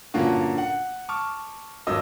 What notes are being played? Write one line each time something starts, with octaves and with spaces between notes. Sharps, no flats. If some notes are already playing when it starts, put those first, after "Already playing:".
G2 A#2 D3 A#3 C#4 F#4
F#5
A5 C#6 D6 F6
G#1 G2 F#3 D#5 E6